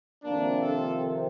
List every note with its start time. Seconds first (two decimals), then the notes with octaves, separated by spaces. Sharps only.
0.23 F2 C3 D#3 A#3 D4
0.62 F4 A4